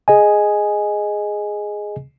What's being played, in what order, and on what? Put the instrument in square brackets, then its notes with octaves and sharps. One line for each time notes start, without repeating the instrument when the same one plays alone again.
[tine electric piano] G#4 D#5 G#5